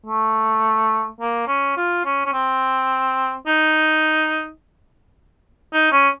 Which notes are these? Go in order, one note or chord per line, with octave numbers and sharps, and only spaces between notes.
A3
A#3
C#4
F4
C#4
C#4
C4
D#4
D#4
C#4